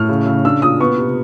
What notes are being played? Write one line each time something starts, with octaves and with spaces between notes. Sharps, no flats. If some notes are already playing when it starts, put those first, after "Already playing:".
Already playing: A2 F6
C#3
C#3
D4 E6
A#2 D#6
B3 C#6
C3